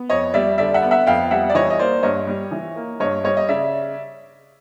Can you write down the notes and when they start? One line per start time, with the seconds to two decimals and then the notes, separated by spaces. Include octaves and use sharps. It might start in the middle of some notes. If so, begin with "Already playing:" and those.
Already playing: B3
0.10 F2 C#5 D#5
0.34 G3 D5 E5
0.58 D3 D5 E5
0.74 E5 F#5
0.82 B3
0.91 E5 F#5
1.07 F2 F5 G5
1.31 G3 E5 F#5
1.50 D5
1.54 E3 C#5 D#5
1.70 D#5
1.79 A#3 C5 D5
2.03 G2 C#5 D#5
2.27 G3
2.51 E3
2.76 A#3
3.00 G2 C#5 D#5
3.24 G3 C#5 D#5
3.37 D#5
3.49 C#3 D5 E5